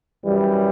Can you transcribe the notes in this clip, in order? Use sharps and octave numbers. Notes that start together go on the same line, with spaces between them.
F#2 E3 G3